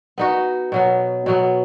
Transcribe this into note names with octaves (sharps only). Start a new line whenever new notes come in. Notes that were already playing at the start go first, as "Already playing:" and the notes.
B3 D#4 F#4
B2 F#3 B3
B2 F#3 B3